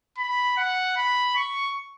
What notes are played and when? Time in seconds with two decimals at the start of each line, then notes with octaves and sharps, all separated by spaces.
0.18 B5
0.57 F#5
0.97 B5
1.36 C#6